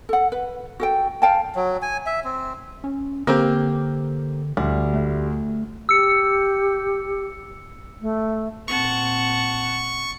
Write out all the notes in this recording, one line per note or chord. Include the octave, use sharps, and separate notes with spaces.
A4 F#5
B4
F#4 A4 G5
F5 G5 A5
F#3
G#5
E5
C4
C#4
D3 A#3 C4 G4
D2 G3
A3
G4 E6 C#7
A3
A#2 C4 F#5 A5 C#6